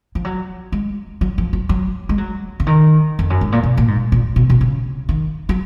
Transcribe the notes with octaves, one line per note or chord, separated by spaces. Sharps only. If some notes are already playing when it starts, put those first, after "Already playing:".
F3
F#3
G#3
F#3
F3
F#3
F#3
G#3
F#3
C#3
D#3
F2
F#2
G#2
A#2
B2
A#2
G#2
A#2
B2
B2
C#3
D#3
F#3